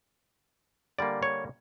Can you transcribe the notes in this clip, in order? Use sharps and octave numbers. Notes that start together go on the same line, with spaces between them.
D3 G3 A#3 D5
C#5